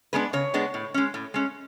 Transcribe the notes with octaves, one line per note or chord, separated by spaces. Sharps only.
G#3 B3 D4 B4
C#3 C#5
G#3 B3 D4
A2
G#3 C#4
A2
G#3 C#4